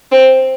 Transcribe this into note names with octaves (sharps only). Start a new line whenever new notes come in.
C4